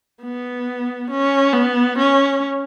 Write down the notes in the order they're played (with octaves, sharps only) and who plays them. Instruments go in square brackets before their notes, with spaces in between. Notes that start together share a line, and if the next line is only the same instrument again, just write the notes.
[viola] B3
C#4
B3
C#4